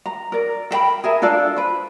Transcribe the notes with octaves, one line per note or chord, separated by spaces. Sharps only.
A#5
A#4 D5
A4 A#4 G5 B5
G#4 A#4 E5
D4 F4 A4 D5
B4 C5